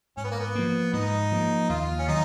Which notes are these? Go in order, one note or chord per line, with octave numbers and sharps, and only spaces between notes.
G#2 C#4
B3
A#3
B3
F3 A#3
G#2 D#4
F3 A#3
D#2 F4
C#4
D#3 F#3 D#4